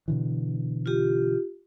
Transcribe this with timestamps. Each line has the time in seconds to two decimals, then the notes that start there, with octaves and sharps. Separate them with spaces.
0.08 B2 D3 E3
0.86 F4 G4